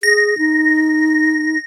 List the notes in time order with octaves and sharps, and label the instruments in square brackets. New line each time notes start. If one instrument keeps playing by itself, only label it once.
[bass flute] G#4 [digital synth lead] A#6
[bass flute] D#4